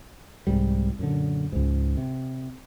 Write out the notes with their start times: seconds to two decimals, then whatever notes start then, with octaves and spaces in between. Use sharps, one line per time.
0.47 C2 G#2 G3
0.99 F#2 A#2 D3
1.52 C#2 G#2
1.97 C3